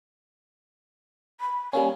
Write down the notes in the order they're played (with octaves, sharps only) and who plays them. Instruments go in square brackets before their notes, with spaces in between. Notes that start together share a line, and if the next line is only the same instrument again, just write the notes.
[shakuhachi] B5
[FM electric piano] G3 A#3 C#4 [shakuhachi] G#5